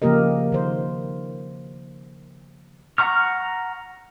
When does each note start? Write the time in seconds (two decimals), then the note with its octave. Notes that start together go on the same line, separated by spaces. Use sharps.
0.02 C#3 F3 A#3 G4 A#4 D#5
0.52 D#3 C5
2.98 F#5 A#5 C#6 F6